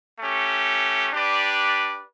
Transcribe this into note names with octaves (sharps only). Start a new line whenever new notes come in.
A3 C#4 G4
D4 G4 B4 D5